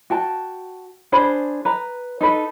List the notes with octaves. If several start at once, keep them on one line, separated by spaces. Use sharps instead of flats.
F#4 G5 A5
D4 G#4 C5 B5
B4 A#5
D#4 A4 B4